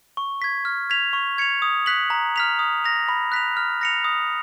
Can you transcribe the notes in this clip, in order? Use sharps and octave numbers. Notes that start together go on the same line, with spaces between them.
C#6
G#6 B6
F6
G#6 B6 F7
C#6
G#6 C#7 F7
D#6
F#6 B6 F#7
A#5
F6 B6 F7
D#6
A#6 F7
B5
F#6 B6 F7
F6
A#6 C#7 F7
D#6